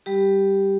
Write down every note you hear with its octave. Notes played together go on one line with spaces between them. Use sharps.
G3 G4